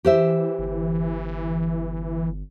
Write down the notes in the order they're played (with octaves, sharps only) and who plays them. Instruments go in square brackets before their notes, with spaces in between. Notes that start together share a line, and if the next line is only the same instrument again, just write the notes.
[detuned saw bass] E3 [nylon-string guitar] G4 C5 E5
[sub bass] G1